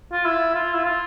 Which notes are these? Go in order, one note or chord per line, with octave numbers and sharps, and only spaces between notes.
F4
E4
F4
E4
F4